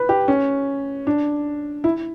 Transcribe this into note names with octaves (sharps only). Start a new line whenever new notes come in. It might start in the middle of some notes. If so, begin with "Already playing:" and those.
Already playing: B4
G4
C#4
D4
E4